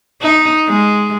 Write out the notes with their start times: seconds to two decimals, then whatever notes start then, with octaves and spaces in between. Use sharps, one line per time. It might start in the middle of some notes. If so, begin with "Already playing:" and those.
0.22 D#4
0.68 G#3